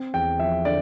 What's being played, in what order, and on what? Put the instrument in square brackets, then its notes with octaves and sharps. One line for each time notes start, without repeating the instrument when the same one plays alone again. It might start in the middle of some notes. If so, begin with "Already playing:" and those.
Already playing: [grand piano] C4
E2 G5
F3 E5
D3 D5